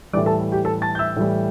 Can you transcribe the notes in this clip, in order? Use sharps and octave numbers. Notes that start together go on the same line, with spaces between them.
A2 E3 G3 D5 D6
A4 A5
E5
G4 G5
A4 A5
A5 A6
G6
E5 E6
A2 E3 G3